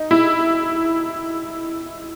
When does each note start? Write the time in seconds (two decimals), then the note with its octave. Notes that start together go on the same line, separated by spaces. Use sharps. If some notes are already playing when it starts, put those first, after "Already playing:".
Already playing: D#4
0.11 E4